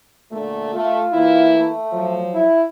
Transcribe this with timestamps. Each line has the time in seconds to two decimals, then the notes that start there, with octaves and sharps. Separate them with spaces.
0.31 A#2 D3 A3
0.73 A3 F4
1.12 E3 A#3 E4
1.55 A3
1.92 F3 F#3
2.34 E4